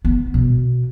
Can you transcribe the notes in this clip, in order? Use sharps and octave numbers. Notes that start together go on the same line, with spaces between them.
B3
B2